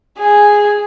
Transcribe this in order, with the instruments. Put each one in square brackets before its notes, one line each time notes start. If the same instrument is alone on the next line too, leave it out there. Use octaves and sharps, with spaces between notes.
[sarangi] G#4